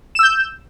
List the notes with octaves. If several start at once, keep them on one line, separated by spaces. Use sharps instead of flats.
E6 G6 E7